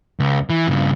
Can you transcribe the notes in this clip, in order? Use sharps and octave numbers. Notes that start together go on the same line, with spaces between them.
C#2
E3
G2 C#3